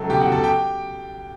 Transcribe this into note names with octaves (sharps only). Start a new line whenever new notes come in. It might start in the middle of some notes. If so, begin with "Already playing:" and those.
Already playing: C#2 F#3 A3 A4
B2 G4 G5
F#4 F#5
B2
A4 A5
G4 G5